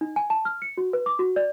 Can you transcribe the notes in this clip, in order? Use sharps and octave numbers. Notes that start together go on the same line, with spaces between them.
D#4
G#5
A5
F6
C#7
F#4
B4
D6
F#4
D5